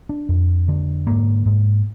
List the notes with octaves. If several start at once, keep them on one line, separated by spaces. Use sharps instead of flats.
D4
F2
D3
G#2 A#3
G#2